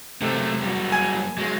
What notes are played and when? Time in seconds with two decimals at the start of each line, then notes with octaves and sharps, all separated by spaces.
0.21 C3 A3 C4 D#4
0.33 F#3 A#3
0.63 G3 F#4
0.92 G#5 G#6
1.38 F#3 G#3 A#3